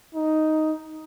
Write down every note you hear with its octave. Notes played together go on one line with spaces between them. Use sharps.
D#4